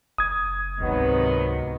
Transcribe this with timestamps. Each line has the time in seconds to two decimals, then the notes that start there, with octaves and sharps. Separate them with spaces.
0.18 F#1 D#6 G#6
0.81 C#2 G#2 C3 D#3 F#3 B3